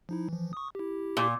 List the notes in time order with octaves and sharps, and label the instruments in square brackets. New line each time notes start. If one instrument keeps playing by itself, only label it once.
[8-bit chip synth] F3 D#4 E4
E3 F3
C#6 D#6
E4 G4
[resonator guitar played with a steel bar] A#2